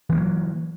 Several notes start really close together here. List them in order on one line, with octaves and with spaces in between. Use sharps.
E3 B3 A#3 F#3